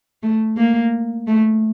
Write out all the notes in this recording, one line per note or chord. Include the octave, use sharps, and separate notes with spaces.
A3
A#3
A3